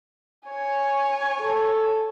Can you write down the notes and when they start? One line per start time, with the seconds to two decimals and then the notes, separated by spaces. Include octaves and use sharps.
0.48 C#5 G#5
1.40 A4